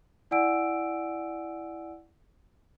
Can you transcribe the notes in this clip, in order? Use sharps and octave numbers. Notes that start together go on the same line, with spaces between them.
E4 D5 F#5 G#5 E6 D7